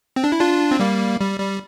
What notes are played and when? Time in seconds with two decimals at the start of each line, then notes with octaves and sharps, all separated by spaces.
0.16 C4
0.24 D4
0.32 E4
0.41 D4 F4
0.71 C4
0.80 G3 A#3
1.20 G3
1.40 G3